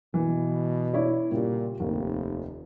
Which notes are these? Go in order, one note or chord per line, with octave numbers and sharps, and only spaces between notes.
B2 E3
E4 C#5 D5
A#2 C#3 G3
F1 D#2